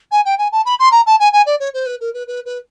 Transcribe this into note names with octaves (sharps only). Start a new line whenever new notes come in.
G#5
G5
G#5
A5
B5
C6
A#5
A5
G#5
G#5
D5
C#5
C5
B4
A#4
B4
B4
B4